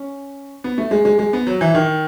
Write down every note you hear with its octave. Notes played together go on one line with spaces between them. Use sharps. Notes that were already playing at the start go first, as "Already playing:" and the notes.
Already playing: C#4
B3
A3
G#3
G#3
G#3
B3
F#3
E3
D#3